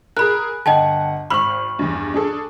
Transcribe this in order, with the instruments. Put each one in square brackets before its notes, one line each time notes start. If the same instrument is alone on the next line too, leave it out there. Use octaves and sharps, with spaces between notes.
[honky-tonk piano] G#4 A#4 [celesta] B5 F#6
[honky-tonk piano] G1 F#5 [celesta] D#5 G5 A5
[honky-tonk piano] G#1 F6 F#7 [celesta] B5 C#6
[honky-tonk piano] E2 G2
D4 G#4 A4